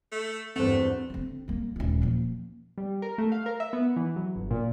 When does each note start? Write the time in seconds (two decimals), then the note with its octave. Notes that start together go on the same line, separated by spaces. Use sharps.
0.12 A3
0.56 E2 G2 A3 C4 C5
1.10 D3 C4
1.48 G3 A#3
1.76 D#1 G#3
2.02 F3 A#3
2.78 G3
3.02 A#4
3.18 A3
3.32 F5
3.46 A#4
3.60 E5
3.73 B3
3.96 E3
4.16 F#3
4.36 G1
4.51 A#2